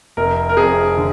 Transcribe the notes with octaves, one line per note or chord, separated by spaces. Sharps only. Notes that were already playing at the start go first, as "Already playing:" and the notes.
F1 A#4
A#4
F2 G#4
D3